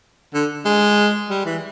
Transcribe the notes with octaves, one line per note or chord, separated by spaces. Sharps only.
D3
G#3
G3
E3